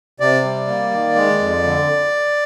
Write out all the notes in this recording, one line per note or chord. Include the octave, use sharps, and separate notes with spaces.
C3 D5
G3
A#3
D#3
G#3
F2
D3